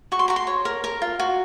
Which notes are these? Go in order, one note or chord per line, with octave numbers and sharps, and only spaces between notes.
F#4 C#6
C6
F#4 A#5
C6
C#5
A#4
A#4 A#5
F4
F#4